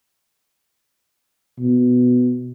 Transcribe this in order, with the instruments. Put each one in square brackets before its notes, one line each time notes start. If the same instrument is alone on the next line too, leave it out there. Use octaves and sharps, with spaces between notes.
[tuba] B2